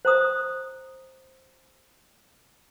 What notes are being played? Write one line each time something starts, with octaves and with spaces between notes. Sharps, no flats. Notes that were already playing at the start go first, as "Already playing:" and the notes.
C5 A#5 D#6